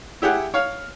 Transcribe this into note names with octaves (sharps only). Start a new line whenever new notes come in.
E4 G4 G#4 F#5
C#5 F5